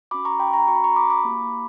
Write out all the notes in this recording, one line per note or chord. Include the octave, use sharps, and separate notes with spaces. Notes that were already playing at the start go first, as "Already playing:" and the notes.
C#4 F#4 B5 D6
A#5 C#6
G5 B5
A#5 C#6
C#4 F#4 C#6
B5
A#5 C#6
B5 D6
B5 D6
A#3 E4 G4